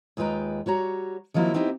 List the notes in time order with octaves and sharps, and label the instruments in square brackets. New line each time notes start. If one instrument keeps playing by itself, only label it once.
[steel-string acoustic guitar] D#2 G#3 F4 B4 G5 A#5
G3 F#4 C#5 A#5
D#3 F3 F#3 A#3 C4 E4
B3 C4 D#4 E4 F#4 G4